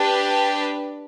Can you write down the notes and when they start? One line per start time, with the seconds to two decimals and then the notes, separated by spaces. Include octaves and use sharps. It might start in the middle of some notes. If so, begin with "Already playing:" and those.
Already playing: D4 G4 B4